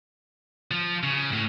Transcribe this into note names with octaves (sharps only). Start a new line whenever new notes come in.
F3
C#3
A2